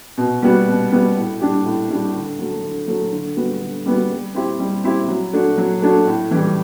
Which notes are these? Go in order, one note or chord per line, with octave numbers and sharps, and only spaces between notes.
B2
G3 B3 F#4
B2
G3 B3 F#4
A2
G3 D4 G4
A2
G3 D4 G4
D3
F#3 A3
D3
F#3 A3
D3
G3 B3 F#4
D3
G3 B3 F#4
G3
C4 E4 G4
G3
C4 E4 G4
F#3
A3 D4 F#4
F#3
A3 D4 F#4
A2
E3 G3